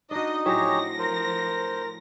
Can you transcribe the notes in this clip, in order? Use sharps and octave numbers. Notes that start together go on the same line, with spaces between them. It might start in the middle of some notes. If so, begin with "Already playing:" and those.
D4 D#4 F#4 D#5
A2 F3 F#3 G4 G#4 C#5 E5 A#6
A#4 C5